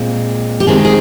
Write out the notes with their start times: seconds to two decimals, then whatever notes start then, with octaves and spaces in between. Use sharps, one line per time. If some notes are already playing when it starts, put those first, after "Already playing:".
Already playing: A#2 G#3 C4
0.60 G4
0.67 D2 C3 D#3 G#3 C4 G#4
0.85 G#4